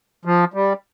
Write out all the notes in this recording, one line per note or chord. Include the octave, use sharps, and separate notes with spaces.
F3
G3